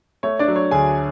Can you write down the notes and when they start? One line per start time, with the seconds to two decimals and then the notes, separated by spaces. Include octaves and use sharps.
0.23 A3 C#5
0.39 D4 D5
0.48 F#3
0.56 C#5
0.71 D2 G#4 G#5